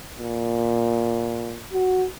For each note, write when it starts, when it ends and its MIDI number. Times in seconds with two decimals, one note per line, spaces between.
0.18 1.60 46
1.73 2.06 66